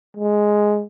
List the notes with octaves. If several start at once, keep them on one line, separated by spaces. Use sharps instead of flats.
G#3